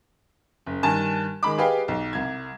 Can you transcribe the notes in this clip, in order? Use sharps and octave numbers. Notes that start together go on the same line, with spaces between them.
F#1
G2 D#3 G#5 A5
D#3 G#3 B5 D6
G4 G#4 B4 D#5 F5 G5
B1
C2 G#6